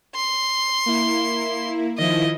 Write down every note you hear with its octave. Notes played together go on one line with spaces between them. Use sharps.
C6
A#3 E4
D#3 F3 E4 D#5